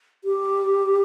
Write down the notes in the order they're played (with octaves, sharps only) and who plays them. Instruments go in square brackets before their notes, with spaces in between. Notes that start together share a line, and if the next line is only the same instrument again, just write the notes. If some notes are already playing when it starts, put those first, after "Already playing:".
[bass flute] G4